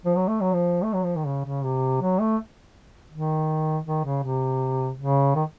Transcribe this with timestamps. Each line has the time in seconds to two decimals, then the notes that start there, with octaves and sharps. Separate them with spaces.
0.05 F3
0.16 F#3
0.27 A3
0.41 F#3
0.53 F3
0.83 A3
0.93 F#3
1.04 F3
1.16 D#3
1.26 C#3
1.45 C#3
1.64 C3
2.01 F#3
2.20 A3
3.12 D#3
3.86 D#3
4.05 C#3
4.23 C3
4.98 C#3
5.35 D#3